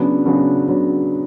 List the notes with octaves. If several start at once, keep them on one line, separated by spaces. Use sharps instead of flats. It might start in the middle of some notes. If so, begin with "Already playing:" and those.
Already playing: C#3 F#3 B3 D4
C#3 F#3 B3 D4
C#3 F#3 B3 D4